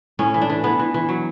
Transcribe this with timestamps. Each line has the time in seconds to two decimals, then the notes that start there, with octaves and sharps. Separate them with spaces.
0.19 A2 C#4
0.34 E3
0.41 D4
0.50 E3
0.64 E3 B3
0.79 E3
0.94 E3
1.09 F#3